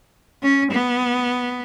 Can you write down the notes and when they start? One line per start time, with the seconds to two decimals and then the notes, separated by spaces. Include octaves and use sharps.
0.43 C#4
0.71 B3